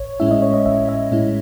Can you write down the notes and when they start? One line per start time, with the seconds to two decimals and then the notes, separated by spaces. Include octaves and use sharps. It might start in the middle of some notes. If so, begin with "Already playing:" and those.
Already playing: A1 C#5
0.20 A2 G#3 C#4 E4 E5
0.31 D#5
0.42 C#5
0.54 D#5
0.65 A1 E5
0.89 E5
1.11 A2 G#3 C#4 E4